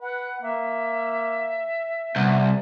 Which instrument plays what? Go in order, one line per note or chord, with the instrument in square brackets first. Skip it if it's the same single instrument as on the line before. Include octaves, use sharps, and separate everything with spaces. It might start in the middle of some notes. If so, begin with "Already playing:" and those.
[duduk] B4 [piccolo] F#5
[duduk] A#3 [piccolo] E5
[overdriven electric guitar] C2 [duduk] B3